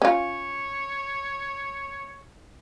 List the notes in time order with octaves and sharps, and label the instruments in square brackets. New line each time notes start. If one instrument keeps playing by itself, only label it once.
[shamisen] C#4 F4 [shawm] C#5